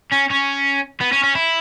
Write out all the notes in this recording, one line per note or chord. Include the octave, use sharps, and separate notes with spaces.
C#4
C#4
B3
C#4
C#4
E4